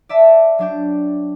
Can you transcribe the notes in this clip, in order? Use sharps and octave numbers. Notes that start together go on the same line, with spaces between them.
D5 E5 A5
F#3 D4 G5